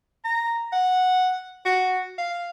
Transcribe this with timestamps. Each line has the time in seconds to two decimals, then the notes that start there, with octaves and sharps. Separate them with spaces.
0.25 A#5
0.73 F#5
1.65 F#4
2.18 F5